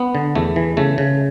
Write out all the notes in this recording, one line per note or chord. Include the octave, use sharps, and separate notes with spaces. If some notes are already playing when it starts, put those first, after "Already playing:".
Already playing: B3
D3
E2 A3
E3
C#3 A3
C#3